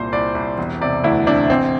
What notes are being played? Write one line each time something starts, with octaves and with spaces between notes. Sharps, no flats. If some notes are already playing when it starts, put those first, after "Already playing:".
Already playing: C2 A#2 C5
C2 D5
C2
E1
C3 D5
D2 E4
C3 D4
A1 C4